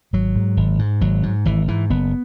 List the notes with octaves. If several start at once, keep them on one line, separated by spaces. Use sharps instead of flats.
G#1 F#3
G#2
G#1
G#2
G#1 F#3
G#2
G#1 E3
G#2 E3
F#1 B3